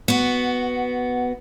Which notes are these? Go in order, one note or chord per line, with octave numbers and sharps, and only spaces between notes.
B3 F#4